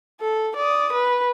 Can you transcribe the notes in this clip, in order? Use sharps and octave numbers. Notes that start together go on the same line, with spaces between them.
A4
D5 D#6
B4